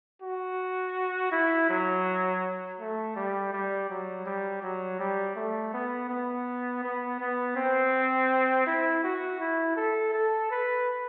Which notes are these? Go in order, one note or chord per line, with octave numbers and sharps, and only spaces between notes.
F#4
E4
F#3
A3
G3
G3
F#3
G3
F#3
G3
A3
B3
B3
B3
B3
C4
E4
F#4
E4
A4
A4
B4